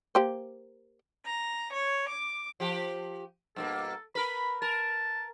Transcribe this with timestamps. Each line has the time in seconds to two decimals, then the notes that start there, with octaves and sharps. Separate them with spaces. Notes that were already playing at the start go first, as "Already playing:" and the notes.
0.15 A#3 G4 C5
1.25 A#5
1.72 C#5
2.09 D6
2.60 F3 G4
3.56 G2 B2 A#3 A4
4.15 A#4 B4 B5
4.62 A#4 A5